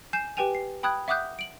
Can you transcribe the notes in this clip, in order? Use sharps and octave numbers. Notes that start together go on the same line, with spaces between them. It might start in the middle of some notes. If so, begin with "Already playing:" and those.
G#5 G6 C7 E7
G4 B4 G5 G#5 F7
C7
G5 B5 D#6 F#6 G#6
E5 F#5 D6 D#6 F#6 G6
D7 F#7